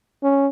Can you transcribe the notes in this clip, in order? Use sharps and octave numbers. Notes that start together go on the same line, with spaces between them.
C#4